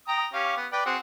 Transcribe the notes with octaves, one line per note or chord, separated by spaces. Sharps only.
G5 A#5 D#6
C#4 G4 F5
B3
B4 D5 G5
C4 F#4 G#4